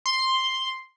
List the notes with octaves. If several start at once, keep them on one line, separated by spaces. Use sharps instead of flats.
C6